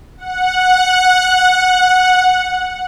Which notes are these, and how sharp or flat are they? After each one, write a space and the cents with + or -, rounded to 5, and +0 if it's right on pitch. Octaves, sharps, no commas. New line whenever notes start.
F#5 -10